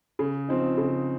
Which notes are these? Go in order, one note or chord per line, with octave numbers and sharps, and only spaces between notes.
C#3
F3 C4 D#4
C#3